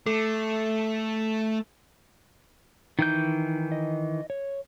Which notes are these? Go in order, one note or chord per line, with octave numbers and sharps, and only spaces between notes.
A3 A4
D#3 E3 D#4 G6
D#5
C#5